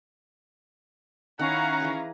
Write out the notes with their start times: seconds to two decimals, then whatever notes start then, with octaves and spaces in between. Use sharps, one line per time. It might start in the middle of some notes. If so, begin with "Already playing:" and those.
1.39 D#3 C#4 E4 F5 F#5 A#5
1.80 E3 G#4 B4